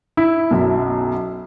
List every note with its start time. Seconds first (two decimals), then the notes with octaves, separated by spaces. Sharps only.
0.17 E4
0.51 B1 F#2